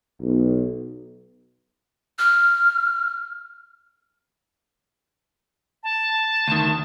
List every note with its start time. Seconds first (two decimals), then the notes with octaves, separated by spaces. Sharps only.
0.21 B1
2.19 F6
5.83 A5
6.48 D2 D#3